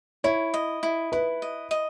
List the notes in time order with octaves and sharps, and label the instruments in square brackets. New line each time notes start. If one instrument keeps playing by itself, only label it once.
[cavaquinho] E4 [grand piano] C#5
[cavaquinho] D#5
E4
[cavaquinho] E4 [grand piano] B4
[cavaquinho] D#5
D#5